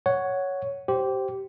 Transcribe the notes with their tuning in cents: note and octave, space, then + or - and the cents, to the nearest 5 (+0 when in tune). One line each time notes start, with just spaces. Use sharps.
C#5 +5 F#5 +0
G4 -20 C5 +0